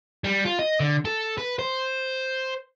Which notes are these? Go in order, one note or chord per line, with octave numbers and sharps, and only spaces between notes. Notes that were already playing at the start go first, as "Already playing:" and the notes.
G3
F4
D#5
D3
A4
B4
C5